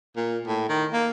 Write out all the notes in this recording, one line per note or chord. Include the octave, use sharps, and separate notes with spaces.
A#2
A2
D#3
A#3